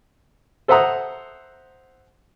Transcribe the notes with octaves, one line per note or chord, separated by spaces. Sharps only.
A4 C5 E5 F#5 A#5 D#6